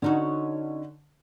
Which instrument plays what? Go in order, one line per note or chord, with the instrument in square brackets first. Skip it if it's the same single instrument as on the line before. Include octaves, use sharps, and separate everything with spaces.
[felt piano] D3 [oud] C#4 D#4 F#4